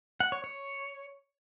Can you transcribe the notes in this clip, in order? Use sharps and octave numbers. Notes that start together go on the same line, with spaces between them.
F#5
C#5
C#5